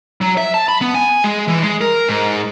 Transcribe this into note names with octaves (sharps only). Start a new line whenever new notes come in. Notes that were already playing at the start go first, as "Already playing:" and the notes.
F#3
E5
A5
B5
B3
G#5
G#3
E3
G#3
A#4
G#2